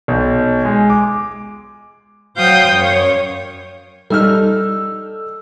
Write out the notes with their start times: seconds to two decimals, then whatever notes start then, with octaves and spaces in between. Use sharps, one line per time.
0.08 B1
0.65 G#3
0.90 D6
2.38 F#3 C5 F5 G5 D#6 G6
2.73 F#2 C#5
4.10 G3 D#4 A4 E6 F6